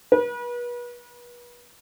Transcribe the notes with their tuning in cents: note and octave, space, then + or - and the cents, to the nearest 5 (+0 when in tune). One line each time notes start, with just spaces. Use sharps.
B4 -35